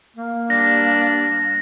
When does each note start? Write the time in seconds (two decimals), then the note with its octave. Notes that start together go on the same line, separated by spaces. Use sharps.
0.16 A#3
0.50 G3 D4 A#6